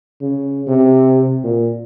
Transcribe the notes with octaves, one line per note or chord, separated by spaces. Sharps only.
C#3
C3
A#2